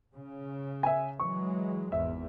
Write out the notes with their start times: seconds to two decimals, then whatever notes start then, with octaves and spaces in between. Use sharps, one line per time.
0.14 C#3
0.83 E5 G#5
1.20 E3 F#3 G#3 C#6
1.92 G#1 E2 E5